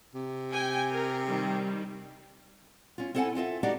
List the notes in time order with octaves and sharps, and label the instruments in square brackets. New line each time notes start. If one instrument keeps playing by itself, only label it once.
[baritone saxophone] C3
[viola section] G5 G#5
A#4
D#3 G3
[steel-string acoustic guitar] C#4 F4
C4 E4 A4 A#4 F#5 G#5
C4 F4 A4 E5
B3 D4 D#4 F#4 G4 D5